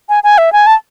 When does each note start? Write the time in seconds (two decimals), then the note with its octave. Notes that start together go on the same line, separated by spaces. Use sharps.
0.09 G#5
0.24 G#5
0.38 E5
0.53 G#5
0.67 A5